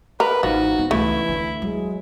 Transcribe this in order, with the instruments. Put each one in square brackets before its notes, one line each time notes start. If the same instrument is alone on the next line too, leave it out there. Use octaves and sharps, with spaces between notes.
[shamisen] A#4 [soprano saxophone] B4
[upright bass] A1 [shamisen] F3 [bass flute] D#4 [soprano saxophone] F#4
[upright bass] B3
[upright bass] C#2 C#3 [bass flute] E3 [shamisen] A3 [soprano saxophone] E4
[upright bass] D2 D3
[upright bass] F#3 [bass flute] G#3